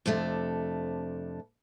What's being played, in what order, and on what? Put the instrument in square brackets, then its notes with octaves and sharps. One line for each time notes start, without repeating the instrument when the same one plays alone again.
[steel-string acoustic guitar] F2 C3 A3 D4